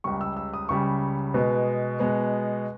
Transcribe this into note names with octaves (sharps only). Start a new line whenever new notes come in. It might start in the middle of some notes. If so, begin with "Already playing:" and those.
C#2 C#3 G3 C#6
E6
E6
D#6
C#2 C#3 G3 C#6
B2 G#3 B3
B2 G#3 B3